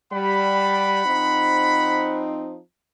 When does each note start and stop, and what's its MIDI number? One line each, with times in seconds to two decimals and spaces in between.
0.12 1.01 55
0.12 2.33 78
0.12 2.33 83
1.06 2.59 53
1.06 2.59 60
1.06 2.59 63